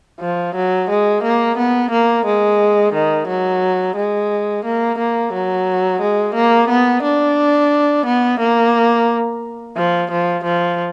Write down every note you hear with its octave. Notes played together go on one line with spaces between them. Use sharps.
F3
F#3
G#3
A#3
B3
A#3
G#3
D#3
F#3
G#3
A#3
A#3
F#3
G#3
A#3
B3
D4
B3
A#3
F3
F3
F3